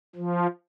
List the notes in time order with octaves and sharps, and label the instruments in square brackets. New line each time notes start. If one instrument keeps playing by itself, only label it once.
[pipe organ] F3